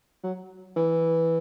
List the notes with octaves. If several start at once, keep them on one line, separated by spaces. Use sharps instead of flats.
F#3
E3